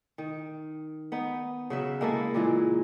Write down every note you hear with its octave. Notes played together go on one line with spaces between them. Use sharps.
D#3
B3 D#4
C#3 F#3 E5
G#3 A#3 E4 A4
A#2 E3 G#3